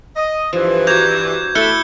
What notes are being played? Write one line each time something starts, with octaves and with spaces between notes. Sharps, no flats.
D#5
G2 E3 F3
F#4 A#5 D6 G6 G#6
A3 E4 F#6 C#7 G7